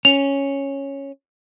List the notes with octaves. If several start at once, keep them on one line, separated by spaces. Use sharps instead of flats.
C#4 F7